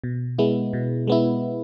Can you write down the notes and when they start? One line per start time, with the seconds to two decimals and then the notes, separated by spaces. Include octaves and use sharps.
0.04 B2
0.38 G#3 B3 E4
0.73 B2
1.07 G#3 B3 E4